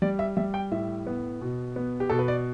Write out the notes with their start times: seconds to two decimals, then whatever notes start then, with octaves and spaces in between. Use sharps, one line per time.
0.02 G3 D5
0.19 E5
0.37 G3 E5
0.54 G5
0.71 A2 E5
1.07 B3
1.41 B2
1.76 B3
2.00 G4
2.10 B2 A4
2.19 B4
2.28 D5